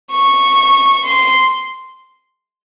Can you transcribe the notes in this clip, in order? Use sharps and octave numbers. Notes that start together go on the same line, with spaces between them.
C#6
C6